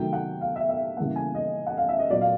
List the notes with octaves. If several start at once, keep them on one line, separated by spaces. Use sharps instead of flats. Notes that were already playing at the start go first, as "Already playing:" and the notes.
Already playing: C3 D#3 F#3 A3 G5
F#5
F5
E5
E5
C#3 E3 G3 A#3 F#5
G#5
D#5
F#5
F5
E5
D#5
A#2 F#3 A#3 D5
F5